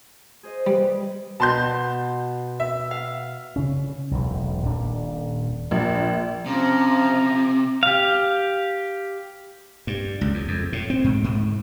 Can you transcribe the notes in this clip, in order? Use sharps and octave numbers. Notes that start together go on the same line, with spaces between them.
G#4 C5 D#5
G3 B4
B2 A5 C6 G6
E5
F5
C#3 C#4
E1 B1
D#1 A#2 D4
A#1
C3 F3 C#4 A#5
G4 F5
G2
C#2
E2
F2
A2
C4
G#2
G#2